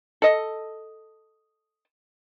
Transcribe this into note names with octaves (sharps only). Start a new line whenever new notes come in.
A4 D#5